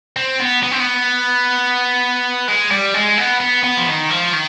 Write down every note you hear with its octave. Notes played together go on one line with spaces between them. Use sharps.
C4
B3
B3
C4
B3
G#3
G3
G#3
B3
B3
B3
F3
D#3
F3
D#3